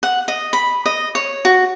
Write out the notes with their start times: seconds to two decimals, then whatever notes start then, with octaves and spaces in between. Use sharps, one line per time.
0.03 F#5
0.28 D#5
0.53 B5
0.86 D#5
1.15 C#5
1.45 F#4